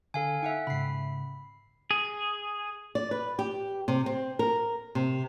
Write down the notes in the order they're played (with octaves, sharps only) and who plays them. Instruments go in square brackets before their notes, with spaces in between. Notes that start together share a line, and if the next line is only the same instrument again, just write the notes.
[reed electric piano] D3 [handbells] A4 F5 G#5
[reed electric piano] D#4 [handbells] E5 F#5 G5
[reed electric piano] G#2 C#3 [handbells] B5 C7
[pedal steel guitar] G#4
[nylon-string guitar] D5
B4
G4
C3
C4
A#4
C3